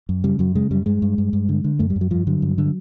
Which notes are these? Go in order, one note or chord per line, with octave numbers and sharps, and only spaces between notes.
F#2
C#3 G3
F#2 F#3
C#3 G#3
F#2 G3
G2 G#3
G2
G2
G2
D3
D3
F#2 A3
G3
F#2
F#3
G2 F3
D3 F#3
G2
D3